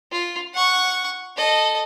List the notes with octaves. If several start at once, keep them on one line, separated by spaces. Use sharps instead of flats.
F4
F#5 C#6
A4 D#5